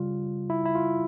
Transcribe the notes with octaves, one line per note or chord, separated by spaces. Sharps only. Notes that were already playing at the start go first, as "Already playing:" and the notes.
Already playing: C#3 G3 F4
E4
E4
F4